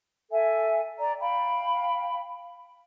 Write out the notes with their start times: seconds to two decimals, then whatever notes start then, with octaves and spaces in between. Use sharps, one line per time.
0.30 A4 E5 G#5
0.98 D5 A#5
1.19 F5 G5 B5